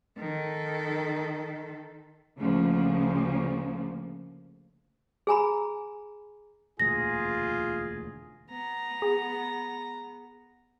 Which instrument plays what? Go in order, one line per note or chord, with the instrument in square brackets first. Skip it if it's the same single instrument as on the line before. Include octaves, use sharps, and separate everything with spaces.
[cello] D#3 A4
[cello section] D2 C#3 F3 A#3
[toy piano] G#4 G#5 A#5 B5
[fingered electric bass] E1 D2 A#2 [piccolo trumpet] F4 [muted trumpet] G#4 [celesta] A#6
[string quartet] B3 [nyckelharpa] A#5
[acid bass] G#4